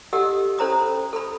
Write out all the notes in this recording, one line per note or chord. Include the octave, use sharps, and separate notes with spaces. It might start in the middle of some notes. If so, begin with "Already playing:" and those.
G4 A4 D#5 F#5 E6
C#4 A4 C5 A#5 B5 D#6
A4 B5